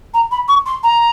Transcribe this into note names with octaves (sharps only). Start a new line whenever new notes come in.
A#5
B5
C#6
C6
A#5